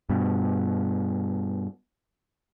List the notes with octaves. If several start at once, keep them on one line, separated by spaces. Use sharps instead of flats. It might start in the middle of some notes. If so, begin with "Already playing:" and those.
G2 B2